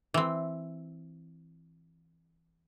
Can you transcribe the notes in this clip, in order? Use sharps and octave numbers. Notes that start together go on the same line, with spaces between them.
E3 C4